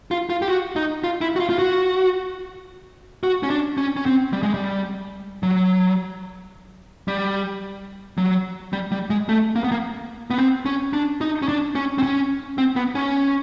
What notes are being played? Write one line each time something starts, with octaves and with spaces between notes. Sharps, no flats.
F4
F4
G4
F#4
D#4
F4
E4
F#4
F4
F4
F#4
F#4
C#4
D4
C#4
C#4
C4
G3
G#3
G3
F#3
G3
F#3
G3
G3
G#3
A3
A#3
B3
A#3
B3
C4
C#4
D4
D#4
C#4
D4
C#4
C4
C#4
C4
B3
C#4